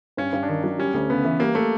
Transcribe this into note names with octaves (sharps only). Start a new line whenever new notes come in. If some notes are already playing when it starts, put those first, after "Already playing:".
G2 C#4
G2
D4
D#3 C#4
F#3 D4
G3 C#4
D2
C#3 B3
E3
G3 A#3
A3